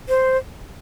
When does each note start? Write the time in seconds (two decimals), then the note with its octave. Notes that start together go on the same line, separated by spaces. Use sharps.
0.09 C5